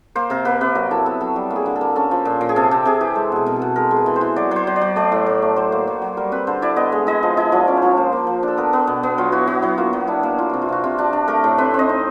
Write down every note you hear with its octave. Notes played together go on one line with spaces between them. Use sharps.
A#3 C5
C3 A#4
A#3 B4
C3 B4
F#3 A#4
E4 A4
B3 A4
F#3 A4
G3 G4
A#3
G#4
D3
A4
A#3
C#4 A4
F3
A#2
A#2
G#4
C3 A4
C3 G4
C3 G#4
E3 G4
G#3 A4
B2 G#4
B2 A#4
A4
B2
G#3 A#4
G#3
B4
E3
C5
E3
F#3 D5
F#3 C5
F#3
D5
F#3
A3 D5
A2
A2
A3
F#3 C5
A#3
F#3
F#3
G3 A#4
C4 B4
D3 C5
E4 D5
B3 D#5
G#3
E4 D#5
F3
E4 D#5
F3 D5
C#4 D5
C5
F3 C#5
A#3 C5
A#3
F3
D4
A4
B3 A#4
B3
B2
B3
F#3 F4
E4 F#4
B3 F#4
F#3 E4
A#3 F4
F#3
D4 E4
A#3
E3 F4
C3 F#4
F4
C3 F#4
C3 F4
D4 F#4
D4
A3 A#4
A2
C4 B4
C4
D#5
D#4